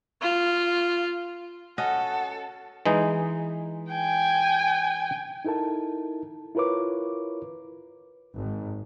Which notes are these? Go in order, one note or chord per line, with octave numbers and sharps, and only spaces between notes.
F4
C#4 F#4 A4 D#5 F#5
E3 G#3 D#4
G5 G#5
D#4 E4 A4 A#4 A5
E4 F4 A#4 B4 C#5 D6
G#1